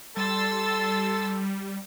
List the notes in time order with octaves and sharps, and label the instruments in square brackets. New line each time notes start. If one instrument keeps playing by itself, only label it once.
[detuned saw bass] G3 [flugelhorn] A4 [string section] C6 E6 A6